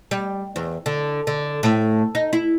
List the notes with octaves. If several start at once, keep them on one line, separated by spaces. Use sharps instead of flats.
G3
E2
D3
D3
A2
D#4
E4